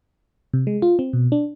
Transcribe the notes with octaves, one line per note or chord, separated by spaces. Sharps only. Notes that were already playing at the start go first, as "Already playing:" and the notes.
C3
G#3
F4
C4
B2
D4